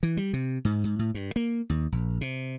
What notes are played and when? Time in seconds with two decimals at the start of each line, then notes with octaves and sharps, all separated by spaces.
0.03 E3
0.17 G3
0.33 C3
0.65 G#2
0.84 G#2
0.99 A2
1.15 G2
1.36 A#3
1.70 D#2
1.92 A#1
2.21 C3